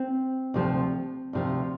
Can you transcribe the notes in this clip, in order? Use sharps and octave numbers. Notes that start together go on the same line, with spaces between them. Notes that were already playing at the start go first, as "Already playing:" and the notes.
Already playing: C4
D2 C3 F3
D2 C3 F3